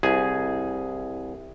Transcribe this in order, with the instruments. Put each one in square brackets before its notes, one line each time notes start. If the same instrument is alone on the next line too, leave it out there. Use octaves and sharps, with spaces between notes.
[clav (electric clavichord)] C2 G#4